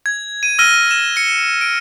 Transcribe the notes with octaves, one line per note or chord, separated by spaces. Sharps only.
G#6
D#7
E6 F6 A#6 D#7 G7
E7
C#7 G7
D7